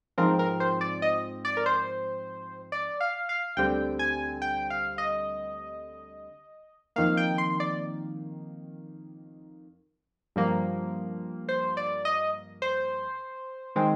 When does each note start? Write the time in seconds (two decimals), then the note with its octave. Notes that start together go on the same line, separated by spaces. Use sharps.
0.18 G#2 F3 C4 A#4
0.39 A#4
0.60 C5
0.81 D5
1.02 D#5
1.45 D5
1.57 A#4
1.66 C5
2.72 D5
3.00 F5
3.29 F5
3.57 D2 D3 G3 C4 G5
3.99 G#5
4.42 G5
4.70 F5
4.98 D#5
6.96 F2 D#3 A#3 F5
7.17 G5
7.38 C6
7.60 D5
10.36 G2 F3 A#3
11.49 C5
11.77 D5
12.05 D#5
12.62 C5
13.76 D#3 G#3 C4